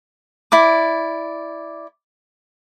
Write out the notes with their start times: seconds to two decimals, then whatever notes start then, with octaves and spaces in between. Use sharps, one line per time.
0.52 E4 D5 D6